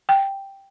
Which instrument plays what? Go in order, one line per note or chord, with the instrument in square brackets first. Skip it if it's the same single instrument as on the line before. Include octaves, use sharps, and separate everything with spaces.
[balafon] G5